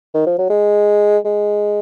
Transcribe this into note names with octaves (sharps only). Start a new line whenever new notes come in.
D#3
F3
F#3
G#3
G#3